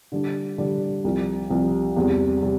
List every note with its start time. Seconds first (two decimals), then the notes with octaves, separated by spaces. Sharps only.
0.12 D3 G3 D4
0.58 D3 G3 D4
1.04 C2 C3 F3
1.50 C2 C3 F3
1.96 E2 C3 G3
2.43 C3 G3